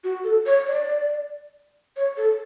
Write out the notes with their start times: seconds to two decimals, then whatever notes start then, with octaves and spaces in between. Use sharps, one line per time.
0.04 F#4
0.24 A4
0.46 C#5
0.67 D5
1.96 C#5
2.17 A4